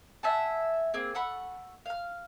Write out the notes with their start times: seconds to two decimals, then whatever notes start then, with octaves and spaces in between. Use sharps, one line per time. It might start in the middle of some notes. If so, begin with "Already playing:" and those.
0.23 E5 F#5 G#5 A5
0.94 A#3 C4 G#4
1.15 A4 F#5 B5 C#6
1.86 F5 F6